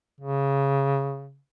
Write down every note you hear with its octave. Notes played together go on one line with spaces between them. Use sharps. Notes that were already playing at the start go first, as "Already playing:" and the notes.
C#3